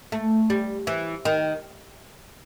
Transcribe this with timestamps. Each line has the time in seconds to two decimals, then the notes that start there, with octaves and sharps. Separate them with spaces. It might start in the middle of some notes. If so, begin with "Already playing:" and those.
0.12 A3
0.50 G3
0.87 E3
1.25 D#3